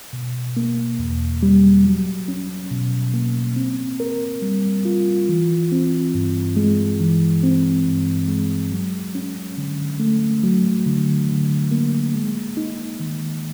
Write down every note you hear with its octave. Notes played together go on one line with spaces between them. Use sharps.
B2
A#3
E2
G3
F#3
C#4
B2
A#3
C4
A#4
G3
F4
E3
C4
G2
G#3
E3
C4
G2
G#3
F#3
C#4
D3
A3
F#3
D3
D3
A#3
G#3
D#4
D#3